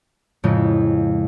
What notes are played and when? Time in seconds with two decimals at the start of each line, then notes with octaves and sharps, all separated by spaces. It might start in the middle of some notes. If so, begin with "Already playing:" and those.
0.44 F2 A2 C#3 F3 G#3